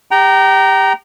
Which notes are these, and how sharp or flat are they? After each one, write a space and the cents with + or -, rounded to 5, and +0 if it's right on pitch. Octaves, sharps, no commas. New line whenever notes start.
G4 +25 G5 -30 A#5 +0